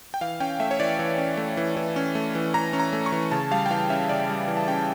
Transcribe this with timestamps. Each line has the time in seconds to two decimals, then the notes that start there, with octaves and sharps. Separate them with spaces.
0.14 G5
0.21 E3 F5
0.40 C#4 G5
0.60 A3 E5
0.71 C#5
0.80 E3 D5
0.99 E3
1.18 C#4
1.37 A3
1.57 E3
1.77 E3
1.96 C#4
2.15 A3
2.35 E3
2.54 E3 A#5
2.73 C#4
2.79 A#5
2.93 A3
3.06 C#6
3.12 E3
3.31 C#3 A5
3.51 G3 F5
3.66 G5
3.71 E3 F5
3.90 C#4 E5
4.09 C#3 D5
4.29 G3
4.48 E3
4.57 A5
4.68 C#4 G5